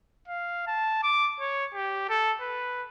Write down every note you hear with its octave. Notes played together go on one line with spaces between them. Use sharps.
F5
A5
D6
C#5
G4
A4
B4